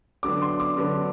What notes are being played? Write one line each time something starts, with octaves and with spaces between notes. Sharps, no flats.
D3 F#3 B3 D4 D6
C6
D6
D3 F#3 B3 D4